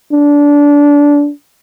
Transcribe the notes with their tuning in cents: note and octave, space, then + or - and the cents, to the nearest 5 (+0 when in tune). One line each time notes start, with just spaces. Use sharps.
D4 -20